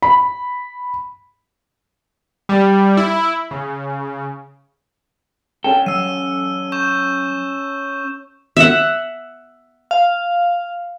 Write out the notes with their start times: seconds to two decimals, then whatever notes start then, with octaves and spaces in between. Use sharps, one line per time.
0.02 B5
2.49 G3
2.97 E4
3.51 C#3
5.64 C#4 A4 G5
5.86 F#3 E6 D#7
6.72 C#6 G6 E7
8.57 E5 F#5
9.91 F5